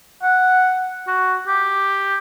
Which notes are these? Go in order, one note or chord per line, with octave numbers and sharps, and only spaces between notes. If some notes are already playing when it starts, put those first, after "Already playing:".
F#5
F#4
G4